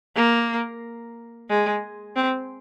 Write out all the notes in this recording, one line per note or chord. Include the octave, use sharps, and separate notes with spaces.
A#3
G#3
C4